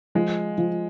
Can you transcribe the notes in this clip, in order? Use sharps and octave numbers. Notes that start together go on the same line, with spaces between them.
F3 G#3
F3